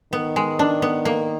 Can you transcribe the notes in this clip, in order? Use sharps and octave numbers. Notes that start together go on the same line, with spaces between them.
D#3 B3
G#3
D4
B3
A#3